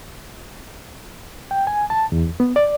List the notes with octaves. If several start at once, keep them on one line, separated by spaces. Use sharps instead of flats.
G5
G#5
A5
E2
B3
D5